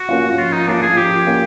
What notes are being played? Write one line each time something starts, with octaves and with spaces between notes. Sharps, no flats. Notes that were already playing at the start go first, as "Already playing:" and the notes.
Already playing: F#4
A#3 C#4 F4
F#4
F3 F4
D#4
A#3 C#4 D4 F4
G#4
F3 G4
A#3 C#4 F4